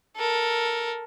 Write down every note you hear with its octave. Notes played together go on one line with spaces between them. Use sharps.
A4 A#4